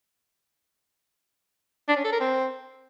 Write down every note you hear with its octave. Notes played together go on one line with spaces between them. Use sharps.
D4
C#4
A4
A#4
C4